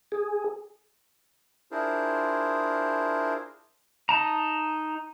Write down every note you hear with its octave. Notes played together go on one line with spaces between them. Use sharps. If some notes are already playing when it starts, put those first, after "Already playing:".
G#4
D4 E4 F4 G#4 A#4 C5
D#4 A5 A#5